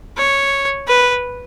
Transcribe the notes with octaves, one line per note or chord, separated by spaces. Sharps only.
C#5
B4